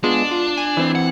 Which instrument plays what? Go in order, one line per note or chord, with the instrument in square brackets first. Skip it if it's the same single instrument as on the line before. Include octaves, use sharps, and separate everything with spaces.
[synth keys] G#3 B3 F4 [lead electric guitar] D4
[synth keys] F4
G#5
[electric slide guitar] E3 C4
[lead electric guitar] F#5